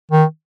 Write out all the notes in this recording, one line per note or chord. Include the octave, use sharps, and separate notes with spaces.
D#3